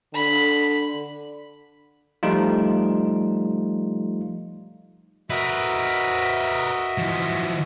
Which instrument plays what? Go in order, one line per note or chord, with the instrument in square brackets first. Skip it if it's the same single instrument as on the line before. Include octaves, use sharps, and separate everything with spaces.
[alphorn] D3 [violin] B5
[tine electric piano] F3 G3 A3 D#4 F4
[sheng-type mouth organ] F#4 D#5 E5 [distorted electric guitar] A#4 B4
[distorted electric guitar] E3 F3